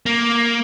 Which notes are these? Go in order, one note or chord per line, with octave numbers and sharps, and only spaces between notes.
A#3